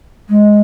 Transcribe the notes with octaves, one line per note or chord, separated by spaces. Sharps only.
G#3